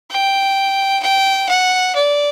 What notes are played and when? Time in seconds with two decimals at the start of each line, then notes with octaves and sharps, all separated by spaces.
0.11 G5
1.03 G5
1.49 F#5
1.95 D5